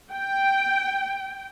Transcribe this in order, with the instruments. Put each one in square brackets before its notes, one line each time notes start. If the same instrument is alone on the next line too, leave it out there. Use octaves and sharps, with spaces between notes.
[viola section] G5